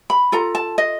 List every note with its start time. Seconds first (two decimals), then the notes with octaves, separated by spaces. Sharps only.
0.10 B5
0.32 F4 A4 A#5
0.55 A5
0.78 D#5